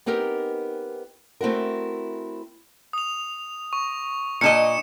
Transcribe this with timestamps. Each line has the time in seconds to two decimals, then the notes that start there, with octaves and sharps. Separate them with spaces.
0.06 B3 C4 D#4 G4 A#4
1.41 A3 C4 E4 F#4 A#4
2.93 D#6 F7
3.73 C#6
4.41 A#2 D4 D#5 C#7 E7